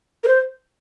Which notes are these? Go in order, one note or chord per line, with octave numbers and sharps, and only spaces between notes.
A#4
C5